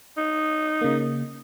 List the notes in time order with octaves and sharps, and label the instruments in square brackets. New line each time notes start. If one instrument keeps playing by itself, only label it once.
[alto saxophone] D#4
[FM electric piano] C#3 A#3